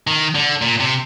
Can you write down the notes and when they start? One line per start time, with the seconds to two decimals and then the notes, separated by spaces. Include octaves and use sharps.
0.07 D#3
0.35 D3
0.62 A#2
0.80 C3